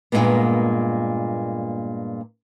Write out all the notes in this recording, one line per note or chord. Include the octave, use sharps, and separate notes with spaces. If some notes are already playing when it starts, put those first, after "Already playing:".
G2 A#2 C#3 G#3 A#3 B3